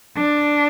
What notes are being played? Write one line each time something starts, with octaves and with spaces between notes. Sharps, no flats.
D4